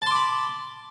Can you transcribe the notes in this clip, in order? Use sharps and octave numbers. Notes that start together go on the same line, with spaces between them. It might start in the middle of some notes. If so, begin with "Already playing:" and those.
A5 B5 C6 D6